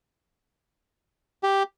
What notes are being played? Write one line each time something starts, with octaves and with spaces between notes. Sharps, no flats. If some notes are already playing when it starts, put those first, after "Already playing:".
G4